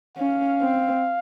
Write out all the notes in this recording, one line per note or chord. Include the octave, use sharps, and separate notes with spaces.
C#4 F5
C4